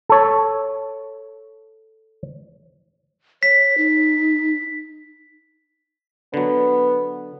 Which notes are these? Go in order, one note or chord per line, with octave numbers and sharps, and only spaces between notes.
A4 C#5
C#5 B6
D#4
D3 F#3 B3